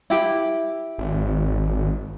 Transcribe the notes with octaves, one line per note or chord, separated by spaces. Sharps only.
E4 G4
G#1